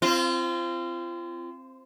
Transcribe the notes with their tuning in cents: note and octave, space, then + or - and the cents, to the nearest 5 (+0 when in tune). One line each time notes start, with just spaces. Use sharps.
C4 +5 F4 -30